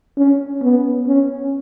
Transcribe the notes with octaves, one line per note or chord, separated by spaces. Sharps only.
C#4
B3
C#4